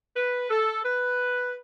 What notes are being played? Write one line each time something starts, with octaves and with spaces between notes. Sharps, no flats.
B4
A4
B4